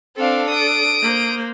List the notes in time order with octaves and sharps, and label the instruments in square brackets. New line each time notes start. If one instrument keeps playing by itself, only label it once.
[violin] C4 F5 [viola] D4 A4
[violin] D#6 D7
[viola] A#3 C5